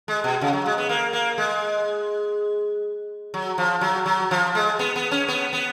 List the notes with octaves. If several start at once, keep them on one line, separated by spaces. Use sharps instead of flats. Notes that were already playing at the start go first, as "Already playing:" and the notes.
G#3
B2
C#3
F#3
G#3
B3
A#3
A#3
G#3
F#3
F3
F#3
F#3
F3
G#3
B3
B3
C#4
B3
B3